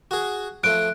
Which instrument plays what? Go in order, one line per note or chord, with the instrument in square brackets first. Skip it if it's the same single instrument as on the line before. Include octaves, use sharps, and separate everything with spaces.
[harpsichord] F#4 G#4
[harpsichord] F3 A3 [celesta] F#6 D7